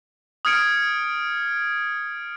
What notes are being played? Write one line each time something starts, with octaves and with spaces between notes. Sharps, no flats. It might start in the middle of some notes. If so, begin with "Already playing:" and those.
D#6 F6 G#6 C#7 D7